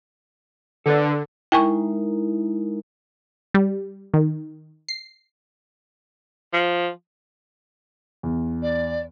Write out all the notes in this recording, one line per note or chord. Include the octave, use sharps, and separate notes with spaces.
D3 A4 B4 D5
G#3 D#4 E4 A#4 G5 G#5 C#6
G3
D#3
C7
F3
E2
D5